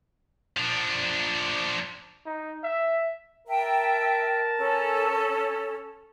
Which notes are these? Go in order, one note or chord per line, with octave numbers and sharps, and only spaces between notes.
F3 D4
D#4
E5
A#4 E5 G5 A5
C#4 A4